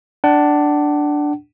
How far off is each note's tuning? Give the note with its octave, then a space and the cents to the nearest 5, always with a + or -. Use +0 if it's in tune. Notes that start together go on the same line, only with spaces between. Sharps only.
D4 +0 F#5 +35